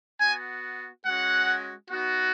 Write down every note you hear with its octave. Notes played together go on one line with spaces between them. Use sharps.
B3 F#4 G#5
G#3 C#4 F#4 F#5
B3 D#4 F#4